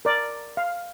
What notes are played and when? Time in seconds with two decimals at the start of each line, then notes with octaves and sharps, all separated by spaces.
0.05 A#4 D5
0.57 F5